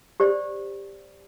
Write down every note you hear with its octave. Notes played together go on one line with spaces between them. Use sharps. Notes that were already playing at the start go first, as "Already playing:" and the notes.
G4 C5 D5